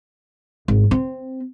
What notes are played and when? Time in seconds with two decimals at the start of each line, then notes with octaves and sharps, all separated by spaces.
0.68 G#1
0.91 C4